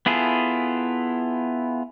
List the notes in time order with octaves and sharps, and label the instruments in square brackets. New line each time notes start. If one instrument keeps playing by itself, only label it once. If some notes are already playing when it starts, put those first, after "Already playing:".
[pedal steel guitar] B3 E4 F4 G#4 A4